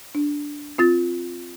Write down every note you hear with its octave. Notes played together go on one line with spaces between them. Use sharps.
D4
C4 F4 A6